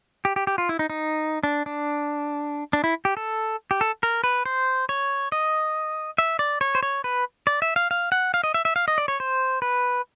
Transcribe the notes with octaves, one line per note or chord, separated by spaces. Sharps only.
G4
G4
G4
F4
E4
D#4
D#4
D4
D4
D4
E4
G4
A4
G4
A4
A#4
B4
C5
C#5
D#5
E5
D5
C#5
C5
C#5
B4
D5
E5
F5
F5
F#5
F5
D#5
E5
E5
F5
D#5
D5
C#5
C5
B4